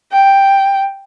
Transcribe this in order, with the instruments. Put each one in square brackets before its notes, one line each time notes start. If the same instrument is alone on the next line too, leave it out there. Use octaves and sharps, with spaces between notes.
[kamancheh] G5